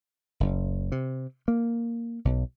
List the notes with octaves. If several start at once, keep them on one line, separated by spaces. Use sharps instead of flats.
F#1
C3
A#3
B1